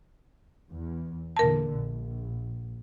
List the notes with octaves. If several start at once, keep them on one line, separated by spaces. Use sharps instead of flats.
E2
E2 A#2 D3 A#4 A5
A#1